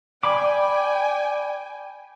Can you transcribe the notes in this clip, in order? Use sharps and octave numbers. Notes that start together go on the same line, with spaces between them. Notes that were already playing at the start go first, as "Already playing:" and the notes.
D5 G5 G#5 B5 D6